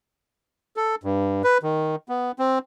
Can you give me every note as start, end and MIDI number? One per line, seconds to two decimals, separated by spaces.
0.77 0.95 69
1.04 1.42 43
1.44 1.58 71
1.63 1.96 51
2.09 2.32 59
2.39 2.59 60